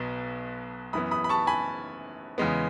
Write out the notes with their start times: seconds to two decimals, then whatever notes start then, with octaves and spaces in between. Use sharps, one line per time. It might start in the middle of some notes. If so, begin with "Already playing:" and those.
Already playing: B1 B2 B3
0.93 F#2 E3 B3 B5 D#6
1.11 B5 D#6
1.24 B5
1.29 A5 C#6
1.47 G#5 B5
2.38 E2 C#3 G#3 B3